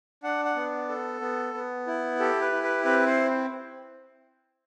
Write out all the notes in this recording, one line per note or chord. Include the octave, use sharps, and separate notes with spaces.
D4 F#5
F#5
B3
A4
B3
B3
E4
G4 A4
B4
E4
B4
C4 B4
C5